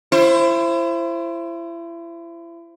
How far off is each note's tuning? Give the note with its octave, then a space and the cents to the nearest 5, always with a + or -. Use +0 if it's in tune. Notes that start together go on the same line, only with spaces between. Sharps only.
E4 +35 C5 +15